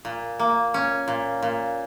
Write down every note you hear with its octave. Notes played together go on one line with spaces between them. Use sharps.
A#2
A#3
C#4
A#2
A#2